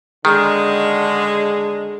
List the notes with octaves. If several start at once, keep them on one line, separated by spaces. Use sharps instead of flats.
D3 D#3 G#3